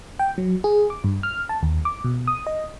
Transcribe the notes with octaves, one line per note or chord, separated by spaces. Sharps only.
G5
F#3
G#4
D6
G2
F6
A5
D#2
D6
B2
D#6
D#5